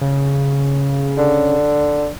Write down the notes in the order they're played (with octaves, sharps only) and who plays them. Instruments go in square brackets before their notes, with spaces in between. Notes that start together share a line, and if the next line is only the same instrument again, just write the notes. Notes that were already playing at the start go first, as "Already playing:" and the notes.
[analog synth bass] C#3
[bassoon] D3